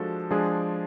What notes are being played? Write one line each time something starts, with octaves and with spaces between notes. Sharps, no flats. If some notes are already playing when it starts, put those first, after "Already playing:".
Already playing: F3 G#3 D4 F#4 A4
F3 G#3 D4 G#4